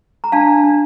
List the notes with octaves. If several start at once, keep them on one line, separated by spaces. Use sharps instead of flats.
A#5
D4 F5 A5
D4
D4